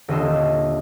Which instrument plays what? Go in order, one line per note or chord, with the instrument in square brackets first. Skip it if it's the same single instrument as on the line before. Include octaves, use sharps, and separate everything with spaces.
[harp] D#1 D3 D#5 C6 E6